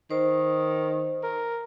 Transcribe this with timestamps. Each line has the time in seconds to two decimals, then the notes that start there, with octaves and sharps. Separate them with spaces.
0.11 D#3 C5
1.23 A#4